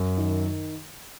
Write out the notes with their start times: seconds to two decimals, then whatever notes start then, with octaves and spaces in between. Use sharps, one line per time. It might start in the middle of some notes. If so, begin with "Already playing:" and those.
Already playing: F#2
0.18 D#3